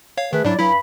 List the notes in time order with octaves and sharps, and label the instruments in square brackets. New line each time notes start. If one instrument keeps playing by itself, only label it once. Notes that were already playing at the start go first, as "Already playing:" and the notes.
[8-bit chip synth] C#5 F5
[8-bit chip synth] D#3 [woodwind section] A3 G#4 B4
[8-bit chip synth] G#2 D4 [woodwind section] F#3 E4 D5
[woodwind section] G2 B5 [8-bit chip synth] F#3 E4